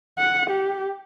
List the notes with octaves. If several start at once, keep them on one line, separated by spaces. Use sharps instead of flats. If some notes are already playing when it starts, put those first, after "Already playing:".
F#5
G4